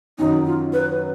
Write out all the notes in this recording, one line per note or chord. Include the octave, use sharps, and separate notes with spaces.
F#2 D#3 F#3 D#4
F4
B4